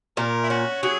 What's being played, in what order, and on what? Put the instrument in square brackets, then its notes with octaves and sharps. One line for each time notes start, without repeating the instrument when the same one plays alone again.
[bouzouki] A#2 [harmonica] A#4
[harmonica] E4
[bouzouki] C#4 [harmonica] F#4
[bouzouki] F#3 [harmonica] G#4